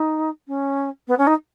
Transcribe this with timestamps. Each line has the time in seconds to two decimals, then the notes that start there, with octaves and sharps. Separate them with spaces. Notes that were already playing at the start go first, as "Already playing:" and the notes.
Already playing: D#4
0.48 C#4
1.07 B3
1.18 C#4
1.27 D#4